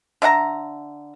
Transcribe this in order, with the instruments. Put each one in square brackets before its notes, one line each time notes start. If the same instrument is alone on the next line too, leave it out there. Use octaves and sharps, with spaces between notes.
[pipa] D3 E5 F#5 A#5